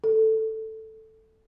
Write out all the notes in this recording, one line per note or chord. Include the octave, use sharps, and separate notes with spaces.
A4